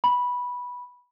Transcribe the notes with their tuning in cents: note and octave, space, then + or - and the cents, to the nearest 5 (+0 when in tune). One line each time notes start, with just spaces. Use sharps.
B5 -10